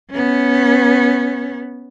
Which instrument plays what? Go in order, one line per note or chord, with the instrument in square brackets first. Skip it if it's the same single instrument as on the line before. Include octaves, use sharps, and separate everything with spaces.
[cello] B3 C#4